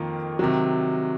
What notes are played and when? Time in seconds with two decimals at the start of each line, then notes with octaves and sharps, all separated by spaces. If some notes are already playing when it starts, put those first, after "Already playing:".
Already playing: F2 D#3 A#3 F4
0.39 C3 D#3 F#3